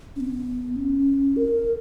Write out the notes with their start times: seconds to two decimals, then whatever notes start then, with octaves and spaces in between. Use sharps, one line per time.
0.16 C#4
0.20 B3
0.76 C#4
1.36 A#4